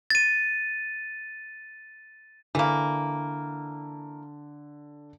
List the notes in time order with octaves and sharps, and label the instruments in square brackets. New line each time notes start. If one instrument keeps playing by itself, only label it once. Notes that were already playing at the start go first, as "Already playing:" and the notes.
[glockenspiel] A6 D#7
[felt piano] D3 [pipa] E3 A#3